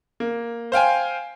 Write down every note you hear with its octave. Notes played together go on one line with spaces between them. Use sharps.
A#3
C5 F5 G5 G#5